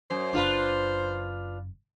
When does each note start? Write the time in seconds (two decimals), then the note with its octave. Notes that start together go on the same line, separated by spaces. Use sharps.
0.10 F#2 C5
0.33 F#1 F#2 D4 F4 B4